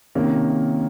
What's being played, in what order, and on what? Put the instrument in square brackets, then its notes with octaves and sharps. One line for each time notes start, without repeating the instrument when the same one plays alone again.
[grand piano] C3 D#3 A#3 C#4